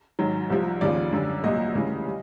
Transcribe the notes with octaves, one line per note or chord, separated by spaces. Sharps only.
G#2 D#3 F#3
C2 C3 F3
D#2 C#3 F3 D5
F#2 D3 G3
C2 A#2 F#3 D#5
D2 C#3 E3 G3
G3